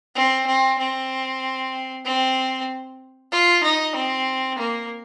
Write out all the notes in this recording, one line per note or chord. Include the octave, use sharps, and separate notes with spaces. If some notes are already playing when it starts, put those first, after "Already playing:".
C4
C4
C4
C4
F4
D#4
C4
A#3